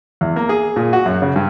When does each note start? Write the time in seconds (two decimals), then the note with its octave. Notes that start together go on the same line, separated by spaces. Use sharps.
0.21 E2
0.36 A#3
0.49 G#4
0.76 A#2
0.93 F#4
1.06 F#2
1.22 C#3
1.36 G2